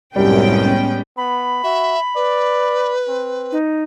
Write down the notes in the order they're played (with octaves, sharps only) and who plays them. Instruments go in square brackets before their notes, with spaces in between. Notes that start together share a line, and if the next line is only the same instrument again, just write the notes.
[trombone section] C2 F#2 [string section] A2 B3 G5 [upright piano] G3 [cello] G#3 C#4
[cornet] B3 [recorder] B5
[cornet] F#4 [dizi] E5
[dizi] B4 [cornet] D5
[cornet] C4
[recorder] D#4